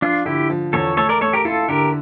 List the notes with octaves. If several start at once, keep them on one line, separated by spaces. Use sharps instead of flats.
F3 D4 F4
D3 E4 G4
F3
E2 A4 C#5
A3 A4 C#5
A#4 D5
A3 A4 C#5
G4 A#4
E4 F4 A4
D3 G4 A#4